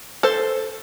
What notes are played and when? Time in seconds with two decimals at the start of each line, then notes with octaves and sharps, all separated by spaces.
0.23 A4 C5